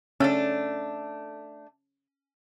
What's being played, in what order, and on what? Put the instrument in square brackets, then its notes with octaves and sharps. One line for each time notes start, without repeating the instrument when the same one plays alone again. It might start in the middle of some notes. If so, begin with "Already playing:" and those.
[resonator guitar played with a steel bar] A3 D4 [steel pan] C#4